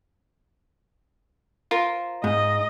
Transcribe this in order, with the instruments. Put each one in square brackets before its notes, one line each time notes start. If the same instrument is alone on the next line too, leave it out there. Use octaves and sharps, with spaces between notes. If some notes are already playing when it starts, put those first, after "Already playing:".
[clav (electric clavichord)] F4 [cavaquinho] A#4 C5 C6
[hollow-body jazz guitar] G#2 [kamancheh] D#5